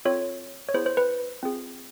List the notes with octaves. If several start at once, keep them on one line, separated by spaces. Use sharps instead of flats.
C4 F4 A4 C#5
C#5
B3 E4 G#4 C5
C5
B4
C4 F4 G#4